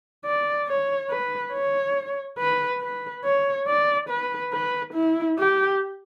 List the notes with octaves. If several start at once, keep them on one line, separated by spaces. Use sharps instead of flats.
D5
C#5
B4
C#5
B4
B4
C#5
D5
B4
B4
E4
G4